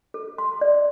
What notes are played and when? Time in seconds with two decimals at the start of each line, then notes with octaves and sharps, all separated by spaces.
0.14 A4
0.38 C6
0.61 D5